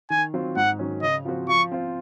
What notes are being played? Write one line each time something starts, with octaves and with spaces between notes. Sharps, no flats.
D#3 G#5
F#3 C4 F4
G#2 F#5
D#3 F#3 C#4
C#3 D#5
F3 C4 F#4
F3 C#6
C4 F4